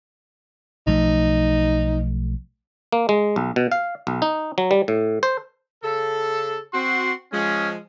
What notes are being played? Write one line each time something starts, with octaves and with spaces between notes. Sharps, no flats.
B1 F3 A3 D#4
A#3
G#3
B1
B2
F5
B1
D#4
F#3
G3
A2
C5
C#3 A4
C4 F#4 C6
F3 G#3 C#4